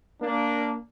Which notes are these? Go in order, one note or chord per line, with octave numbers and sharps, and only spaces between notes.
A#3 D4